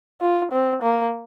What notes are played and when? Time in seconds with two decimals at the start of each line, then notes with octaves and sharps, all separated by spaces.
0.21 F4
0.52 C4
0.83 A#3